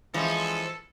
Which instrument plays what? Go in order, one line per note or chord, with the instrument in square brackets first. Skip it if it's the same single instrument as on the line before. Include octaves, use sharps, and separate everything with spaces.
[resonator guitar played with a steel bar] E3 F3 [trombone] G#3 [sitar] C4 C#4 [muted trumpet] A4